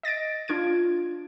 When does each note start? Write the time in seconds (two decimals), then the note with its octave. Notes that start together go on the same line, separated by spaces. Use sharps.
0.03 D#5 A6 A#6 D7
0.48 D4 F4 G#6 D7